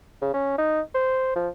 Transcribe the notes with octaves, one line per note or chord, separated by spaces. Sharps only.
C#3
C#4
D#4
C5
F3